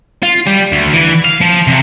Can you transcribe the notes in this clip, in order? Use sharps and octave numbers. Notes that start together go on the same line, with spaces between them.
F4
G3
D2
E3
F5
F3
C3